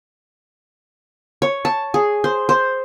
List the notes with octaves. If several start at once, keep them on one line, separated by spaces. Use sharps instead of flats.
C#5
A5
G#4
C5
C5